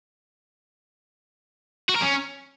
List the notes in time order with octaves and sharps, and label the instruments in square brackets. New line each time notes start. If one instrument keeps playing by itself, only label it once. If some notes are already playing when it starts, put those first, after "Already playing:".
[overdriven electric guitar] F#4
A#4
C#4